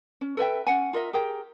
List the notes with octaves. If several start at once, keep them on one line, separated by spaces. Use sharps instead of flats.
C#4
A4 B4 E5 G5
C#4 F#5 G#5
F4 A#4 D#5 E5
G4 G#4 A#4 G5